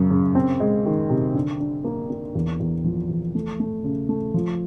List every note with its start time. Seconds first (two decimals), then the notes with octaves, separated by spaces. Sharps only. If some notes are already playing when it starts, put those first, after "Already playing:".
Already playing: F#2 C#3
0.11 C#3
0.35 C4
0.60 G#3
0.86 D#3
1.10 C3
1.35 D3
1.60 D3
1.85 A#3
2.10 A#3
2.35 E2
2.60 E2
2.84 F3
3.09 E2
3.35 A3
3.60 A3
3.84 C#3
4.09 A3
4.34 F3